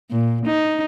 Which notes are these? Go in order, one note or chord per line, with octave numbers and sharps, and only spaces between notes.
A#2
D#4